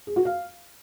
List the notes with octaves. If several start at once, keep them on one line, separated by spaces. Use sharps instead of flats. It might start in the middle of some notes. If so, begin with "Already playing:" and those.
G#4
F#4
F5